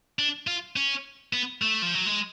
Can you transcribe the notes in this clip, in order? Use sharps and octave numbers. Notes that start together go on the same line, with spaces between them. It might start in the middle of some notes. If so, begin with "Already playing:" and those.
D4
F4
C#4
B3
A3
F3
F#3
G#3